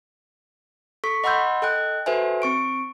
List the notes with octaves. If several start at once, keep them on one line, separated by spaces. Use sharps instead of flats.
A4 C#6 B6
D#5 F#5 B5 C6 E6 G6
A4 D#5 G5 F#6
F#4 A4 B4 C5 E5 G#5
C4 C#6 D7